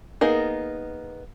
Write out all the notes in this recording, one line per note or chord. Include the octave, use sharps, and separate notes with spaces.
A#3 B3 D#4 G#4 A#4